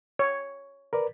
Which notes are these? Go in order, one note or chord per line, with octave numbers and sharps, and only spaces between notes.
C#5
A#4 B4 D5